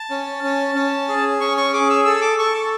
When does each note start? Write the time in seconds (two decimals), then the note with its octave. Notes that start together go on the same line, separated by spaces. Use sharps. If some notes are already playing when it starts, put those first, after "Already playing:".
Already playing: A5
0.11 C#4
0.44 C#4
0.75 C#4
1.09 G#4
1.40 C#4 C#6
1.57 C#6
1.73 G#4 D6
1.90 E6
2.05 A4 E6
2.21 D6
2.38 A4 C#6
2.54 A5